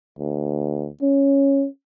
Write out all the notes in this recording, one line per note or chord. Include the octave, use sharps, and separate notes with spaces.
D2
C#4